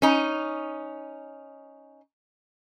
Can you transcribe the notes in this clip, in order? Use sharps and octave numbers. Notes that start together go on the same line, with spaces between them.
C#4 D#4